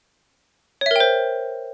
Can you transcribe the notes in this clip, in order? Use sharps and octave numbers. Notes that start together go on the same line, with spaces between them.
A#4 C5 C#5 E5 G5